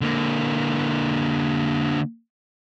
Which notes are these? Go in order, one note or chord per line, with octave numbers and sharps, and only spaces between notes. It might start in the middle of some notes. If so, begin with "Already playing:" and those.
D3 A#3